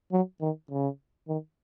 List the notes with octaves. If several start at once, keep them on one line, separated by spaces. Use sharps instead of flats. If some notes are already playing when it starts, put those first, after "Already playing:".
F#3
D#3
C#3
D#3